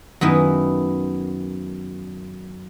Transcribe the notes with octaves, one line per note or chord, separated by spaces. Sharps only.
F#2 D#3 B3 E4